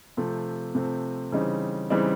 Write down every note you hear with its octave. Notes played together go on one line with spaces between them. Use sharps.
C3 F3 A3 C4
C3 F3 A3 C4
C#3 E3 G3 C4 D#4
C#3 E3 G3 C4 D#4